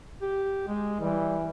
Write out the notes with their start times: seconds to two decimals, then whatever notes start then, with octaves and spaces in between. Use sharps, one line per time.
0.22 G4
0.67 G#3
1.00 E3 G3